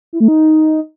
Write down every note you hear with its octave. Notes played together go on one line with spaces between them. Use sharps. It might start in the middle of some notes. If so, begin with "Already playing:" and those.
E4
A3
D#4